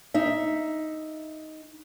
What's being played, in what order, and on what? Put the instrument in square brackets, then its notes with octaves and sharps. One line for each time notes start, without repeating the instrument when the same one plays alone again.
[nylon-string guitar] D#4 E5